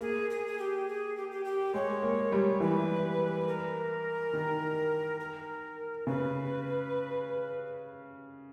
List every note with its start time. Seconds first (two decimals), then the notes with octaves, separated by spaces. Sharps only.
0.01 A#3 G#4
0.30 G#4
0.47 G#4
0.59 G4
0.88 G#4
1.17 G4
1.31 G4
1.45 G4
1.74 G#3 C#5
2.02 A#3
2.32 G3
2.60 E3 B4
3.48 A#4
4.33 D#3
5.20 A#4
6.07 C#3 B4